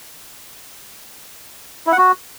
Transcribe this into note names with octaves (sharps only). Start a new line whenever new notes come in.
E4
F#5
F#4